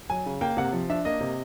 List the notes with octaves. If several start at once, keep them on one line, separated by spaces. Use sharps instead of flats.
F#3 G#5
C#3
A#3 G5
C3 F#5
F3
D4 E5
A#3 D#5
C3